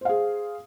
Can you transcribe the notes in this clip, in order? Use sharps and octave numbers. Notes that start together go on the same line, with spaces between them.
G#4 C5 F5